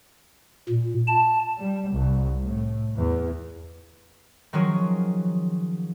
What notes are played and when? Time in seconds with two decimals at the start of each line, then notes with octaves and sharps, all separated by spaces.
0.69 A#2
1.07 A5
1.60 G3
1.92 C2
2.44 A2
2.97 E2
4.53 D#3 F3 F#3 C#4 G#4 A#4